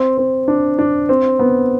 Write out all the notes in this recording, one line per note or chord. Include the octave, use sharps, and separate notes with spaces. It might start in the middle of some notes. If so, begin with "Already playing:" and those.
Already playing: C4
C4
D4
D4
C4
B3